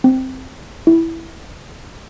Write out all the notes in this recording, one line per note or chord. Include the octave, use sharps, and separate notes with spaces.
C4
E4